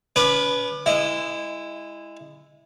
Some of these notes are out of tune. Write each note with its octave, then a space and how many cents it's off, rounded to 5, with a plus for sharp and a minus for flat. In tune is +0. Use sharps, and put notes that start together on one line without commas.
C#4 +45 B4 +0 D6 +30
G#3 -20 E4 +0